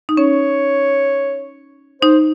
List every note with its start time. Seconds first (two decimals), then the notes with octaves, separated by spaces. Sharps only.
0.09 D#4
0.17 C#4 C#5
2.02 D#4 C5